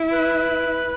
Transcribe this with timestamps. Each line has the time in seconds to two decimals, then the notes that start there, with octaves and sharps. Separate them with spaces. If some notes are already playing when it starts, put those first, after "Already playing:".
Already playing: E4
0.11 B4